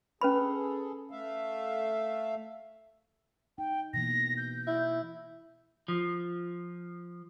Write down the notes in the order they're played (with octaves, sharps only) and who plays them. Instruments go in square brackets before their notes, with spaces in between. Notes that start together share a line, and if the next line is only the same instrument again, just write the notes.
[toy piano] C#4 B4 B5 [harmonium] G#4 A4
[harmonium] A3 E5 F5
[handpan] D#4 [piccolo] G5
[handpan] B2 E3 A#3 [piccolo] A#6
[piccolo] G6
[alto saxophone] E4
[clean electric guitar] F3